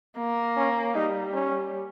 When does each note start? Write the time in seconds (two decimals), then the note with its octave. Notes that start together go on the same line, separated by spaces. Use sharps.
0.18 A#3
0.57 C#4
0.95 G3 D#4
1.33 C#4